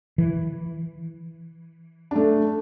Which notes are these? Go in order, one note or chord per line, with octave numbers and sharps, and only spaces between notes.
E3
A3 D4